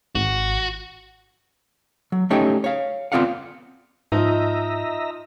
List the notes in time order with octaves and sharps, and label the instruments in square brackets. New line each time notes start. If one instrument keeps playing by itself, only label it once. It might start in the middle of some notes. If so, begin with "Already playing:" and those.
[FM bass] G#1 [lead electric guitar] F#4
[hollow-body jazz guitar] F#3
A3 C#4 D#4 G4 C#5 G5
C#5 F5
B3 C4 F4 D5 F5 F#5
[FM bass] G#2 [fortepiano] F3 D#4 [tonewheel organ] D#5 E5 A#5